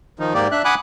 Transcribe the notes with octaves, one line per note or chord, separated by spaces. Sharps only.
D#3 F3 D#4
G#2 A#3 G4 D5
D4 E5 F#6
F#5 G#5 B5 D6 D#6 F#6